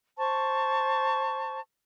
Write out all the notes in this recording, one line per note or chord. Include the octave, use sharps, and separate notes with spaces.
C5 A5 C#6